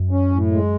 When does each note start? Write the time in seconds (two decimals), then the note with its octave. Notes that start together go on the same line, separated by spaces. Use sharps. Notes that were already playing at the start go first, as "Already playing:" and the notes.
Already playing: F#2
0.11 C#4
0.32 A2
0.51 G#3